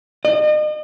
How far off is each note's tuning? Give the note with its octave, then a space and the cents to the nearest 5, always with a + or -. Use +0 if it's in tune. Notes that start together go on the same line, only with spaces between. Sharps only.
D#5 -40